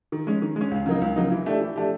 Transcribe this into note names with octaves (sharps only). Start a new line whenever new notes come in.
D#3
G#3 C#4
D#3
G#3 C#4
C#2
C#3 F#3 A#3 D#4
C#2
C#3 F#3 A#3 D#4
E3
A3 D4 G4
E3
A3 D4 G4